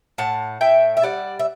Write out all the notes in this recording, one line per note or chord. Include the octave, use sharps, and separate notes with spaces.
A2 F#5 A5
A2 E5 G5
E5
G3 D5 F#5
E5